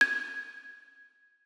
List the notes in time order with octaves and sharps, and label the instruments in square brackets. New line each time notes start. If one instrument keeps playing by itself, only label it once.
[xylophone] G#6